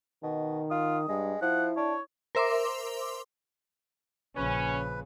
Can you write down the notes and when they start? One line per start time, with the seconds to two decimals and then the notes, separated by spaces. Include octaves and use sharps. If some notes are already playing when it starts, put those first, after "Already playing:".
0.23 B2 D#3
0.71 F4 D#6
1.08 G2 G#3
1.42 F3 E4 F#5
1.77 D4 C#5
2.35 A#4 C5 E5 C6 D6
4.36 A#1 C#3 C#4 B4